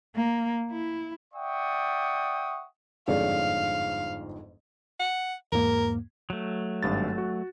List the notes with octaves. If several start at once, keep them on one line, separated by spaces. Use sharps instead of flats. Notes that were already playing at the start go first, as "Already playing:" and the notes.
A#3
E4
D5 E5 F#5 G5 C#6 D#6
G1 F2 G#2 G#4 C#5 D5 F5
F#5
E2 G#2 A#3 A#4
F#3 A3
G#1 G2 A6
F#4